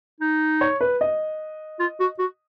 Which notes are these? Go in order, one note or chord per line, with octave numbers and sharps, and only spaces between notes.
D#4
C#5
B4
D#5
F4
F#4
F#4